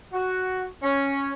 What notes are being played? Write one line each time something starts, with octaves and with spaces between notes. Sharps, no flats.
F#4
C#4